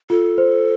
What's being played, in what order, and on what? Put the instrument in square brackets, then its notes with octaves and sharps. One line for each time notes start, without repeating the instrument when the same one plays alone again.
[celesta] F4 [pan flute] A4
[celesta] C5